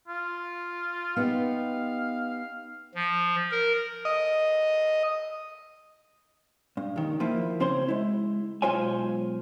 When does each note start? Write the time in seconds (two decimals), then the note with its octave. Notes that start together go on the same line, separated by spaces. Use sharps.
0.08 F4
1.16 B3 D#4 G4 F5
2.95 F3
3.51 A#4
4.05 D#5
6.77 G2
6.96 D#2 D#3
7.20 F3 A#3 E4
7.60 C#3 C4 C5 C#5 C6
7.88 G#3 E4
8.62 B1 G#3 F4 C5 C#5 G#5